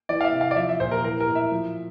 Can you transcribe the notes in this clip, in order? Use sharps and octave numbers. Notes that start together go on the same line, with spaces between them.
E3 D5
F5
E5
C3
F5
D5
F3 E5
E5
A#2 C5
A#4
E3 A#4
A#4
A2
E5
F3